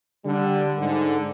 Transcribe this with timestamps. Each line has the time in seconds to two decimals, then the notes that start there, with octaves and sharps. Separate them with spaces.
0.24 D3 G3
0.78 G#2 D3